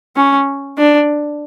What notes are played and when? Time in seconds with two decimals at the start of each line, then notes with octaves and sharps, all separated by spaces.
0.16 C#4
0.78 D4